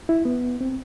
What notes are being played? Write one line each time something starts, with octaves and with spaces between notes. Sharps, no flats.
E4
B3
C4